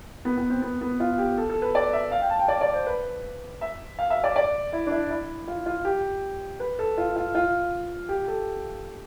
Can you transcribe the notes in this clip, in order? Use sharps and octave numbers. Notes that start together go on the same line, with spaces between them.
B3
B3
C4
B3
B3
F4
G4
A4
A4
B4
D5
E5
F5
G5
A5
G5
D5
D5
C5
B4
E5
F5
E5
D5
D5
E4
D4
E4
E4
F4
F4
G4
B4
A4
F4
F4
F4
G4
A4